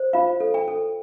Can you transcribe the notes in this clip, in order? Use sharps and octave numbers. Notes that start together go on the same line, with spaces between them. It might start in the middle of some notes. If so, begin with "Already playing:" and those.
Already playing: C5
F4 F5
A4
G5
A4